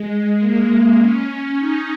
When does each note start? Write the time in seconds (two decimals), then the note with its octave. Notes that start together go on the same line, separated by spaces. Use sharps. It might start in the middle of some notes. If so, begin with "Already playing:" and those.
Already playing: G#3
0.40 A#3
0.99 C#4
1.59 D#4